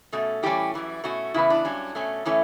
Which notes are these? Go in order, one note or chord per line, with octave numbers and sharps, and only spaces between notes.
B2 A3 C#4
A2 E3 G3 C#4 G4
F#2 E3 G3
B2 A3 C#4 F#4
C#3 E3 B3 E4
D4
G2 F#3 C#4
B2 A3 C#4
A2 E3 A3 C#4